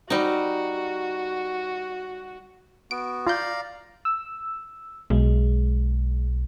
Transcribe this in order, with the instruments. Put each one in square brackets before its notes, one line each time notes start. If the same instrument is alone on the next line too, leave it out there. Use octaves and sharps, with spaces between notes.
[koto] G3 D#4 [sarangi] F#4
[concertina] B3 F#4 [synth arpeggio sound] D7
[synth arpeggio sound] F4 G6 [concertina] D5 F5 A#5
[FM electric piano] E6
[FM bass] B1 [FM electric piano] G#3